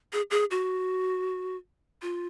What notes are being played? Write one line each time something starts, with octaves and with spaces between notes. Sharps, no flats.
G#4
G#4
F#4
F4